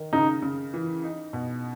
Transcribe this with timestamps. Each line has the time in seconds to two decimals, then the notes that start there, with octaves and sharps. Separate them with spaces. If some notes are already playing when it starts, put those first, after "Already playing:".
Already playing: D#3
0.13 C#3 D#4
0.42 C#3
0.74 E3
1.04 D#4
1.33 B2